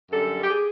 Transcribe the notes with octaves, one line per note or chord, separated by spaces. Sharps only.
F#2 D3 G3 A4
G4
G#4